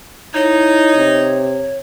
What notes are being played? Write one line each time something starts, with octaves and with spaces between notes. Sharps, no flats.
D#4 E4 C#5
C3